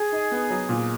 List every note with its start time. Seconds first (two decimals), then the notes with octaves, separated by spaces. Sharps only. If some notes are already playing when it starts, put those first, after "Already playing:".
Already playing: G#4
0.12 D#4
0.32 B3
0.50 F#3
0.69 A#2